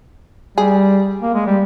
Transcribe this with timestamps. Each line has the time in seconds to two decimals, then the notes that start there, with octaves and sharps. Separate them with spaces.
0.57 G3 G#4
1.22 A#3
1.34 G#3
1.47 G3